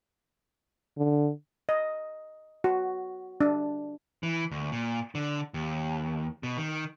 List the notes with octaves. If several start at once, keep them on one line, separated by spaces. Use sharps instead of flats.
D3
D#5
F#4
D4
E3
D2
A#2
D3
D#2
B2
D#3